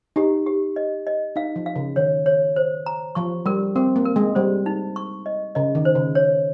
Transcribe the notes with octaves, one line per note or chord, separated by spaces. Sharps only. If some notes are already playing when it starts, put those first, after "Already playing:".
D#4 G4
G4
D#5
D#5
D#4 F5
F3
F5
C#3
D#3 C#5
C#5
C5
A#5
F3 C#6
G3 A#4
C4 A#4
A#3
A#4
G#3
G3 C5
D#4
C#6
D#5
C#3 D#5
D#3
C5
C#3
C#5